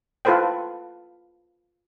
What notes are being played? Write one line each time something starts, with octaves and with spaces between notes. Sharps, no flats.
E4 F4 A4 B4 C5 G5